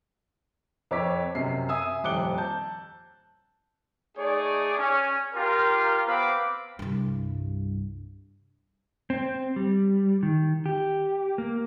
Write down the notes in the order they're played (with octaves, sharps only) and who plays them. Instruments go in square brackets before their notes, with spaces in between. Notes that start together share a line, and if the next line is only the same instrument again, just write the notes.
[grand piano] F2 C#5 D6 B6
F#2 C3 C7
E5 G#5 D#6 E6
D#1 F2 D6 F#6 C#7 G7
A5 G6
[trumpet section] A3 D#4 G#4 C#5 D5
C#4
F4 G4 A#4
B3 C4 F5 B5 D6
[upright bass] C2 G2
[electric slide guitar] C4
G3
D#3
G4
A#3